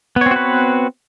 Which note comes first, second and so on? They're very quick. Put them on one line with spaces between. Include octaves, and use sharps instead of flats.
B3 C#5 C4 F#4 B4